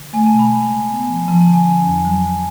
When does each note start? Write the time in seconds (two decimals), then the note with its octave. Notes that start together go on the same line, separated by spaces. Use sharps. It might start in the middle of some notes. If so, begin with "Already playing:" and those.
Already playing: D3
0.13 A3 G#5
0.26 A5
0.32 B2
0.39 B5
0.51 G#3
0.71 C#3
0.90 B3
1.09 F3
1.28 F3 A5
1.41 A5
1.48 D3
1.54 G#5
1.66 C#4
1.85 F2
2.05 F#3
2.24 F#3